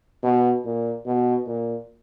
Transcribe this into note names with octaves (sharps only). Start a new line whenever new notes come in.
B2
A#2
B2
A#2